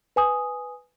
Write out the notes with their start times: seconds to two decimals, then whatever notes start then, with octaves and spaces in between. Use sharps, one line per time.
0.16 B4 G#5 D#6